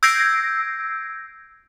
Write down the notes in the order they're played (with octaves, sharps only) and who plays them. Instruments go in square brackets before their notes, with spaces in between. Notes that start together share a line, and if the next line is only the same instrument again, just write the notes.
[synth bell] E6 G6 G#6 A#6 C7 D7